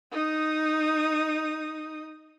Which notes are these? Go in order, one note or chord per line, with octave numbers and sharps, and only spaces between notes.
D#4 D#6